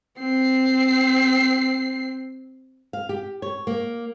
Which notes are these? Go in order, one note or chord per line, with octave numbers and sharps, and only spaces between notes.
C4 C7
F5
G4
C#5
A#3